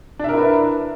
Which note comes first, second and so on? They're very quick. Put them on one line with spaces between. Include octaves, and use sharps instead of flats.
D4 E5 A#4 E4 B4